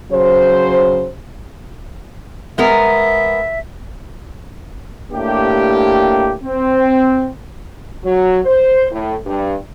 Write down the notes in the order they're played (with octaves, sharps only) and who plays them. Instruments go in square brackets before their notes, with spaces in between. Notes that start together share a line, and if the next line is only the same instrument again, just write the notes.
[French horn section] C#3 F#3 C5
[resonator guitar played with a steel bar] G#3 B3 A#4 [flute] E5
[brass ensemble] A2 A#3 D4 G4
C4
[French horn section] F#3
C5
A2
G2